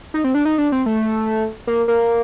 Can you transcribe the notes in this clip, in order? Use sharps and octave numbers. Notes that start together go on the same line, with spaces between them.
D#4
C4
D4
D#4
D4
C4
A3
A#3
A#3